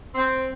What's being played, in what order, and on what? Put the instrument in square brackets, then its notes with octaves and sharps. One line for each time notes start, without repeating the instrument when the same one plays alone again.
[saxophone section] C4